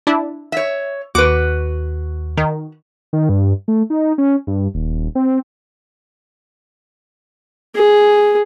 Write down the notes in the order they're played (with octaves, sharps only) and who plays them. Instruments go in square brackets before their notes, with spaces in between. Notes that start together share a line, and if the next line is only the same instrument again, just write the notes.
[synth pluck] D4 E4
[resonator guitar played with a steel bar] C#5 E5
[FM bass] D#2 [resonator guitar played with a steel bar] F#4 B4 [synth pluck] D6
[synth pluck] D#3
[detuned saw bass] D#3
G2
A3
D#4
C#4
G2
D#1
C4
[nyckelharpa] G#4